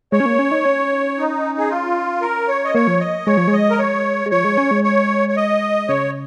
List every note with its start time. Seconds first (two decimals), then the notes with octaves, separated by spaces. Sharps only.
0.12 G#3 C#5
0.20 C#4
0.26 A#3
0.39 C#4
0.51 D#4
0.65 C#4
1.18 D#4
1.58 G#4
1.70 F4
2.22 A#4
2.48 C#5
2.65 D#5
2.75 A#3 C#5
2.87 F3
3.00 D#5
3.27 G#3 C#5
3.37 F3
3.48 G#3
3.53 D#5
3.71 A#4
3.79 C#5
4.26 G#3
4.31 F3 C#5
4.44 G#3
4.58 C#4
4.71 G#3
4.84 C#5
5.29 C#5
5.37 D#5
5.88 C#3 C#5